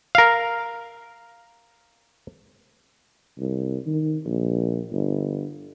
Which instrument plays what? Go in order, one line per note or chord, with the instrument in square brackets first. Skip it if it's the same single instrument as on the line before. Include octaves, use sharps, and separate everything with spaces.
[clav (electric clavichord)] A#4 F5
[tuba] C2
D#3
A#1
G1